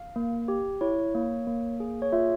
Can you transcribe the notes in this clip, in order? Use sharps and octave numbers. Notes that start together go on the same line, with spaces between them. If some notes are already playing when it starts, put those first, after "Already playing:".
Already playing: F5
A#3
G4
E4 C#5
A#3
A#3
G#4
C#5
F4 E5